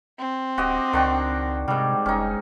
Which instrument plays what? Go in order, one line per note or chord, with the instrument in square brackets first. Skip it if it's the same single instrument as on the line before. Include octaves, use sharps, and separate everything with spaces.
[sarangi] C4
[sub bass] D1 [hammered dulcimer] F#4 G4 D#5
[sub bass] C#2 [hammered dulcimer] D#3 D4 F#4
[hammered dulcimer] G#2 G3 [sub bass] C3
[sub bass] F1 [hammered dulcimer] C#4 D#4